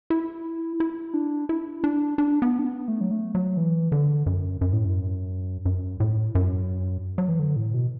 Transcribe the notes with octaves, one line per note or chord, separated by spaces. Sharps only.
E4
E4
D4
E4
D4
D4
B3
D4
B3
A3
F#3
A3
F#3
E3
D3
F#2
F#2
A2
F#2
F#2
A2
F#2
F#3
E3
D3
A2
B2